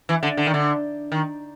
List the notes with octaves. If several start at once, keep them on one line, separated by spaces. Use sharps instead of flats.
E3
D3
D3
D#3
D3
D#3